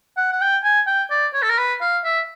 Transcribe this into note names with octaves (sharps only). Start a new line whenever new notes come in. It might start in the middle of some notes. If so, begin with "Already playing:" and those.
F#5
F#5
G5
G#5
G5
D5
C#5
A4
A#4
B4
F5
E5